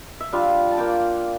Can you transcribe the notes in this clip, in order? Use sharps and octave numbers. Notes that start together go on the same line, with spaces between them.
E5
G3 D4 F4 F5
A5
A#3 D4 F4 G5